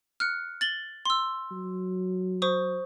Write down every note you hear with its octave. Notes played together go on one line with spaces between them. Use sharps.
F6 F#6 C#7
A6 F#7 G7
C6 E6
F#3
C5 C#6 D#6